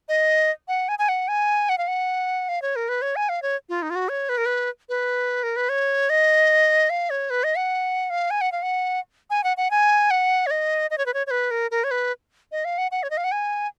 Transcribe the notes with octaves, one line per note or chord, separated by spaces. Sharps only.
D#5
F#5
G#5
G#5
F#5
G#5
F#5
F5
F#5
F5
C#5
A#4
B4
C#5
G#5
F5
C#5
F4
D#4
F4
F#4
C#5
B4
A#4
B4
B4
A#4
B4
C#5
D#5
F5
C#5
B4
D#5
F#5
F5
G#5
F#5
F5
F#5
G#5
F#5
F#5
G#5
F#5
C#5
D#5
D#5
C#5
B4
C#5
C#5
B4
A#4
A#4
C#5
B4
D#5
F5
F#5
F#5
C#5
D#5
F5
F#5
G#5